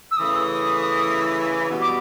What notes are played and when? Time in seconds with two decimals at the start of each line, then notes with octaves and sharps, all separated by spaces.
0.11 E6
0.17 C#3 E3 A3 D#6
1.70 B2 G3 B3
1.81 D6